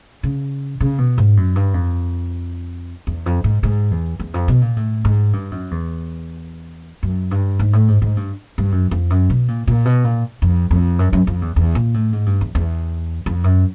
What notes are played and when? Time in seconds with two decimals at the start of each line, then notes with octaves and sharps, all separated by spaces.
0.23 C#3
0.81 C#3
0.98 B2
1.18 G#2
1.37 F#2
1.56 G2
1.74 F2
3.07 E2
3.26 F2
3.44 G#2
3.63 G#2
3.91 E2
4.20 E2
4.34 F2
4.48 B2
4.62 A#2
4.77 A2
5.05 G#2
5.33 G2
5.51 F#2
5.71 E2
7.03 F#2
7.31 G2
7.59 G#2
7.73 A2
7.88 G#2
8.02 G#2
8.17 G2
8.58 G2
8.72 F#2
8.91 F2
9.10 F#2
9.30 B2
9.48 A#2
9.68 A#2
9.85 B2
10.04 A#2
10.42 F2
10.71 F2
10.99 F#2
11.13 F#2
11.27 F2
11.42 E2
11.56 E2
11.75 A#2
11.94 A2
12.13 G#2
12.26 G2
12.41 E2
12.55 E2
13.26 F2
13.44 F#2